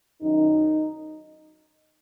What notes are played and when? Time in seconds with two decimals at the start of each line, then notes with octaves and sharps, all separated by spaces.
0.22 F#2 D#3 F#3 D#4